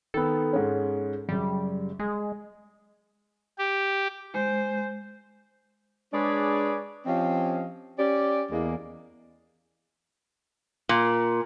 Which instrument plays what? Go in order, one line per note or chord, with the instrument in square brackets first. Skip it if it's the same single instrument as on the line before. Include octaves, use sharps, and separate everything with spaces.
[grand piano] D#3 B3 [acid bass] A4
[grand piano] G#2 G#3 C#4
[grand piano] F#2 C#3 [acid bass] G3
[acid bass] G#3 [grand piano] G#4
[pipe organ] G4
[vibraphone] G#3 [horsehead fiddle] C5
[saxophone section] G#3 D4 G#4 B4 C#5 D5
F3 C4 C#4 G4 D#5 F5
C#4 G4 D5
E2 G#3 A#3
[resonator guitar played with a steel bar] A#2